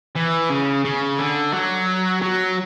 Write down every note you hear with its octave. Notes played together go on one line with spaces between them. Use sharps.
E3
C#3
C#3
D3
F#3
F#3